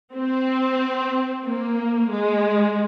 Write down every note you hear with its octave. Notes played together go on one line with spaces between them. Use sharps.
C4
A#3
G#3